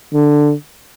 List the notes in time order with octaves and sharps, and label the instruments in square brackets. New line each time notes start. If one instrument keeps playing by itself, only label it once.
[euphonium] D3